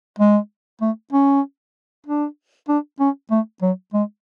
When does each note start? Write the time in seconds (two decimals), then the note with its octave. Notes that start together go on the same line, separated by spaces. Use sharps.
0.19 G#3
0.81 A3
1.12 C#4
2.06 D4
2.69 D4
3.00 C#4
3.31 A3
3.62 F#3
3.94 G#3